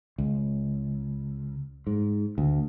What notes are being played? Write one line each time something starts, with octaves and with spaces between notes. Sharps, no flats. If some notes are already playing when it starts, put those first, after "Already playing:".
C#2
G#2
D2